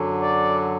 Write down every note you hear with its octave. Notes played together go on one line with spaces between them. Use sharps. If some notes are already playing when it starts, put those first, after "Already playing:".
Already playing: F#2 D3 F#3
D5